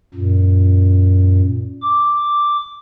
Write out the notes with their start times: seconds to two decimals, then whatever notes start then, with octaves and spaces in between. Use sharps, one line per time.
0.15 F#2 A#2
1.82 D6